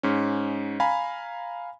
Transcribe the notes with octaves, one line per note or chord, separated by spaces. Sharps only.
G#2 C#4
F5 G#5 A#5 B5